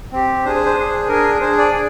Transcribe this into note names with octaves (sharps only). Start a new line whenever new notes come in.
C4 G4
D4 G#4 C5
C5
C5
D4 G#4
D4 G#4 A#4
D4 G#4 C5
D5
G#4